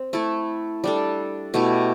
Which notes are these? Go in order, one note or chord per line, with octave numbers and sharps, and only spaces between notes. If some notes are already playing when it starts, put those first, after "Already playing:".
Already playing: C4
A3 E4 A4
G3 D4 A4
B2 A3 E4 G4